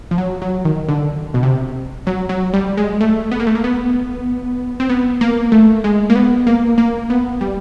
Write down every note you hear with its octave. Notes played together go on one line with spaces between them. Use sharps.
F3
F#3
F#3
D#3
D3
B2
C3
F#3
F#3
G3
G#3
A3
B3
A#3
A3
A#3
B3
C4
B3
A#3
A3
G#3
A#3
B3
A#3
A#3
B3
G3